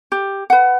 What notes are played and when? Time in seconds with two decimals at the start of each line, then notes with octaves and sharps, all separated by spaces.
0.12 G4
0.50 B4 F#5